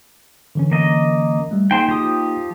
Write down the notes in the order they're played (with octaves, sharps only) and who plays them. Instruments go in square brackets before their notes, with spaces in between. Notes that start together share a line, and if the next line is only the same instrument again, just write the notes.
[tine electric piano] D3 E3 C#4
[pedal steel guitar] A#3 D#5
[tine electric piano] G3 A3
[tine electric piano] A#3 D#4 [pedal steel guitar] G#4 C5 G5
[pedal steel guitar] F3 G4 D#6